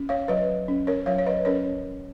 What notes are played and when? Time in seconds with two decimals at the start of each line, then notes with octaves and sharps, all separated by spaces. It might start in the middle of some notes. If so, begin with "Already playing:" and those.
Already playing: C#4
0.09 C#5 F5
0.28 F#3 B4 D#5
0.68 C#4
0.87 A#4 C#5
1.06 F#3 C#5 F5
1.18 C#5
1.27 B4 D#5
1.45 C#4 A#4 C#5